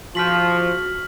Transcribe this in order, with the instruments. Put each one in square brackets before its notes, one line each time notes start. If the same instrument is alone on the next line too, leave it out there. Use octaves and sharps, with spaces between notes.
[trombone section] F3 [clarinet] F#4 [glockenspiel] F6 B6 F#7